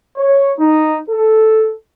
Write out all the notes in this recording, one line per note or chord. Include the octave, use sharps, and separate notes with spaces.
C#5
D#4
A4